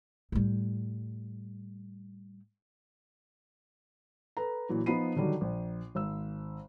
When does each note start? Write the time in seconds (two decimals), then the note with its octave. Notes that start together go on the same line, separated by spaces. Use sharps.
0.32 A2 G3
4.37 A4 B4 A#5
4.69 A#2 E3 F#3
4.86 F3 B3 D#4 B5 C7 D#7
5.16 D3 D#3 F#3 G3
5.41 A#1
5.95 G#1 E6